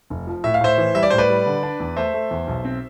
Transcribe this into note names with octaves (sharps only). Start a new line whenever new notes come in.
F1
F3
A2 E5
F5
A2 C5 E5
E3
G3 E5
D5
A2 C5
B4 D5
G3
D3
D4
E2
A3 C5 E5
A3
E2
B1
C4